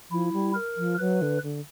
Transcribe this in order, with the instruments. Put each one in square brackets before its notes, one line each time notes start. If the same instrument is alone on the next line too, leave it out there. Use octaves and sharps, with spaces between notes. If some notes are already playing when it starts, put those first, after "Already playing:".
[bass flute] F3 [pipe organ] E4
[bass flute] G3
[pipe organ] A#4
[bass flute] F3
[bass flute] F#3 [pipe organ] B4
[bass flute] D3
D3